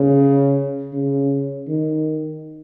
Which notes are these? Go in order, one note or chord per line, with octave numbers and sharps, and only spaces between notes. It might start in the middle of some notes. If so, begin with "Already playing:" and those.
Already playing: C#3
C#3
D#3